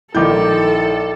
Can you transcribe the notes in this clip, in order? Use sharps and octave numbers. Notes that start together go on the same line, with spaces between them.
A#1 D#3 E4 A4 D6 G6